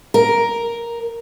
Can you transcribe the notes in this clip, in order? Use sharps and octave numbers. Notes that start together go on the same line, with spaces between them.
A#4